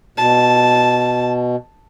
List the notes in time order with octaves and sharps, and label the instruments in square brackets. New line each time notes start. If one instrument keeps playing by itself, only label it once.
[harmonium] B2 [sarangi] A5